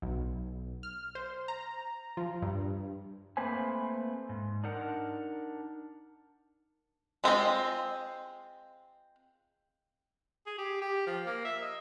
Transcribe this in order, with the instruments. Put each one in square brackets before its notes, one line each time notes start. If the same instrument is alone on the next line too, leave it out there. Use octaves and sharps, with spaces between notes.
[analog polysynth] B1
F6
C5
A#5
F3
G2
[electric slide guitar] A3 A#3 C4 B4 C5 G#5
G#2
D4 D#4 A#4 F#5
[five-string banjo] G#3 C4 F4 D#5
[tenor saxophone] G#4
G4
G4
F3
A#3
E5
D#5